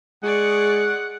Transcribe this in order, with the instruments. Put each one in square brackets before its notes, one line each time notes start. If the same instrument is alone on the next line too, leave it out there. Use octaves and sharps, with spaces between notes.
[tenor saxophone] G#3 [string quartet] G#4 D5 C#6 [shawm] F#5